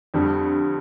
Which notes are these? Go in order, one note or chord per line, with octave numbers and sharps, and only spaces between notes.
F2 D3 G3